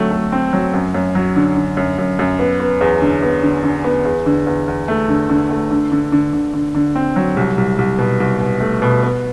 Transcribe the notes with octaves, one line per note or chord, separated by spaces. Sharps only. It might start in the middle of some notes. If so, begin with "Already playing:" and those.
Already playing: D3 F#3 A3 C4
A3
C4
F#3
F#2
F#2
F#3
D3
D3
F#2
F#2
F#2
B3
B3
E2
D3
B3
D3
D3
B3
E2
D3
E2
E2
A3
D3
D3
A3
D3
D3
D3
D3
D3
D3
C4
F#3
C2
C2
C2
B2
C2
B2
A3
B2
B3